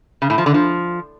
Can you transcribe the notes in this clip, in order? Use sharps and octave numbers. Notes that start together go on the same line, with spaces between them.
C#3
A2
F3
D3
F3